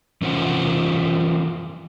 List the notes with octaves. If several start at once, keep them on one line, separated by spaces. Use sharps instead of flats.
E3 C#4 F4 C5 F#5